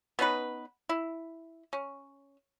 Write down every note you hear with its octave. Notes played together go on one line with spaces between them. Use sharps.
B3 C#4 D#4 B4
E4
C#4